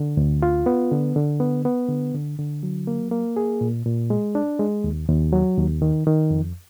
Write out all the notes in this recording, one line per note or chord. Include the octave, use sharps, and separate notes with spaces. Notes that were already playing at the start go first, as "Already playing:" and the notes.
Already playing: D3
D2
F4
B3
D3
D3
B3
B3
D3
D3
D3
F#3
A#3
A#3
G#4
A#2
A#2
G#3
D4
G#3
D#2
D#2
F#3
D#2
D#3
D#3
F2